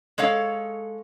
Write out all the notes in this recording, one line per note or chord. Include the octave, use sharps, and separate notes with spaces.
G#3 A4 C#5 F5